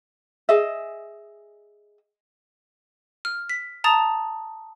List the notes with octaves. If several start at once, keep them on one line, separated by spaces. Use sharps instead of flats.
G#4 D#5 E5
F6
B6
A5 A#5 D#6 A6